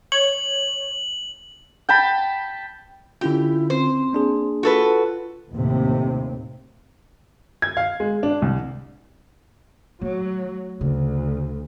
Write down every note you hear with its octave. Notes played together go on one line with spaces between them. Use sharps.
C#5 F#7
G5 A5 B5
D3 C#4 E4 F4 G4
C4 C5
A#3 D4 G#4
F4 F#4 A4 B4
D#2 A2 C3
G#6
F5
G#3
D4
C2
F#3 A3
D2 C#3